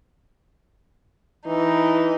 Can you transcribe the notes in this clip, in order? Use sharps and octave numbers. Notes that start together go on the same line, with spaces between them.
E3 D#4